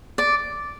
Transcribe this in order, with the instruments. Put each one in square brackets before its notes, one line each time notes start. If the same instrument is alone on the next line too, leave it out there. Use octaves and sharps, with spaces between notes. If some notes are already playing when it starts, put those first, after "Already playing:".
[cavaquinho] D5